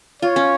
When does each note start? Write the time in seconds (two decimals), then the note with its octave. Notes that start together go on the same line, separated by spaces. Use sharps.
0.22 F4 C#5
0.36 C#4